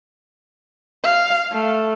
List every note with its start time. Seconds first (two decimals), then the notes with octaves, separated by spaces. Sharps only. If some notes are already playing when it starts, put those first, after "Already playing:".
1.04 F5
1.52 A3